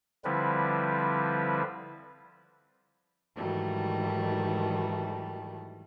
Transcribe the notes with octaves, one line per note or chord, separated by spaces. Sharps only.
D3 F3 G3 C4 E4 B4
G#2 D#3 E3 F#3 G3 A3